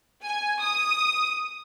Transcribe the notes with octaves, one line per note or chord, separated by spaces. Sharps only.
G#5
D#6